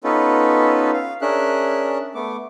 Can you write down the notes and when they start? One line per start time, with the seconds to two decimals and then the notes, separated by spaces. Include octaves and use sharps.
0.04 B3 C#4 D#4 F4 A4 B4
0.94 F5
1.21 C#4 D4 G#4 A#4 E5 F#6
2.15 A3 B3 D6